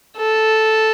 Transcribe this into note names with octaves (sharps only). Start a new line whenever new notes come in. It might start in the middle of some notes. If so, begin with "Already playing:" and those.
A4